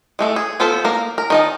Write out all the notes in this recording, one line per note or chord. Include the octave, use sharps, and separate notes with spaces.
G#3 A3 A4
G#4
F3 B3 F4 A4 C5
A#3 A#4
A#4
D#3 D#5 A5